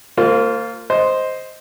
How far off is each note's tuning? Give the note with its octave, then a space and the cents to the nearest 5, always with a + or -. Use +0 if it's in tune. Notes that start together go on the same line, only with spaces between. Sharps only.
A#3 -35 F4 +0 C5 +0
C5 +0 D#5 +5